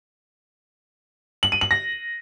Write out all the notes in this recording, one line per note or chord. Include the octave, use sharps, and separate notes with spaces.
F#7
D#7
F#7
A#6